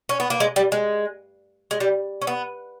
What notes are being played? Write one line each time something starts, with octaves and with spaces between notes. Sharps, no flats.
C#4
B3
A#3
G#3
G3
G#3
G#3
G3
C#4
B3